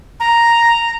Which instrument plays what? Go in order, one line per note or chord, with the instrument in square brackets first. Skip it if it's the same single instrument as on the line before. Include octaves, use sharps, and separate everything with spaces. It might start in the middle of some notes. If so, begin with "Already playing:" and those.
[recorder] A#5